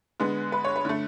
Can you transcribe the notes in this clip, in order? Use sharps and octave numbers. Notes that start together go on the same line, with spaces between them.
D3 G#3 B3
B4
C#5
B4
D3 A3